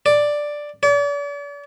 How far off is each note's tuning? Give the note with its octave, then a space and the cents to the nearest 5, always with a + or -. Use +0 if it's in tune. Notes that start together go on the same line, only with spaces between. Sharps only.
D5 +5
D5 -40